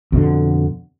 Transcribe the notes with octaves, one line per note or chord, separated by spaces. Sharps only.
F2 B2 D3